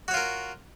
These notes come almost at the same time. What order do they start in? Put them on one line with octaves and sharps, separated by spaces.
F#4 C#5 F4 A#4